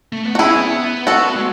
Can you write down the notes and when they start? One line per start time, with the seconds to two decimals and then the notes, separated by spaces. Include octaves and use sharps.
0.12 A3
0.25 B3
0.35 F#4
0.39 C#4 E4 G#4
0.56 B3
1.07 F#4 A4
1.35 G#3